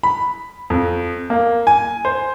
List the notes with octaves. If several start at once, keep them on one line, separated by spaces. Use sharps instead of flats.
B5
F2
A#3
G#5
C5